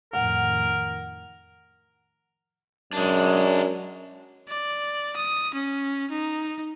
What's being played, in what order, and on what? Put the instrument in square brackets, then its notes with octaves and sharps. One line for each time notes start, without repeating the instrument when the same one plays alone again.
[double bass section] F2 A2 D#3 [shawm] A#4 [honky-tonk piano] F#5
[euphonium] F#2 [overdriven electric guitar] G#3 D4
[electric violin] D5
D#6
C#4
D#4